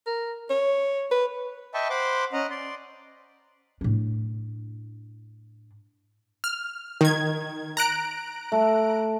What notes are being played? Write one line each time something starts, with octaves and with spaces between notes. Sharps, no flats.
A#4
C#5
B4
D#5 E5 G5 A5 B5 C#6
C5 F#5 B5 C6 D6
C#4 D#5 F#5 A#5
D5 C6
A2 D4
F6
D#3 G#6
A#5 F#6 D7
A3